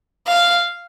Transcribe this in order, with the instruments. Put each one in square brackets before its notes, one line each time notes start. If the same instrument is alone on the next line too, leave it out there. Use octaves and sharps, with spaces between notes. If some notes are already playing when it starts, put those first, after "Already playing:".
[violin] F5